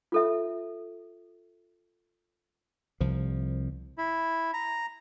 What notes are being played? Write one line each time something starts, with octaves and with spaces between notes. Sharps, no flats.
F4 A4 E5
C2 F3
E4
A#5